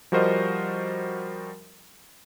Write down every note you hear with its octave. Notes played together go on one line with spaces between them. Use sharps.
F3 G3 F#4 A#4 C5 D#5